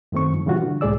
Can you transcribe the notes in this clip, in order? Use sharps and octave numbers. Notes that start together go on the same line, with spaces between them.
F#2 D#3 A3 C4 C#6
G2 F3
A#2 C#3 E3 G3 F4 F#4
D3
C2 A2 G#3 G#4 D5 E6